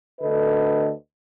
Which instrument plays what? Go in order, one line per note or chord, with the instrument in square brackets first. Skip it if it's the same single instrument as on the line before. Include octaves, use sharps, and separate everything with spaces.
[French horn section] D2 D3 A4 B4 D#5